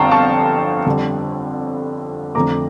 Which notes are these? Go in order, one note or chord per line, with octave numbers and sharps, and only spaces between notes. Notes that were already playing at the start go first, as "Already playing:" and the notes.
Already playing: G1 F2 D3 F5 G5 A5 A#5 C#6
A5 C#6
F2 D3 G3
F2 D3 A3 A#5 D6